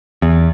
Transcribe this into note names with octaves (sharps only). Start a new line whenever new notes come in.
E2